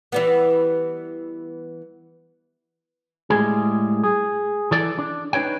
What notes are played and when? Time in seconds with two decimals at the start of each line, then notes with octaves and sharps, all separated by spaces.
0.12 E3 G3 B3
3.30 A2 G3 G#3 G#4
4.04 G#4
4.71 E3 A4 D5
4.99 D4
5.33 D4 D#4 B4 C#5 G5